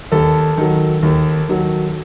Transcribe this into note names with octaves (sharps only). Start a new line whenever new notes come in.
D#2 A4
D#3 F#3
D#2
D#3 F#3